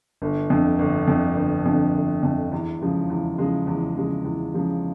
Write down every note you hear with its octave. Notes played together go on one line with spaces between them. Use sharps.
G1
F2 D3
G1
F2 D3
G1
F2 D3
G1
F2 D3
E2
C#3 F3 G#3
E2
C#3 F3 G#3
E2
C#3 F3 G#3
E2
C#3 F3 G#3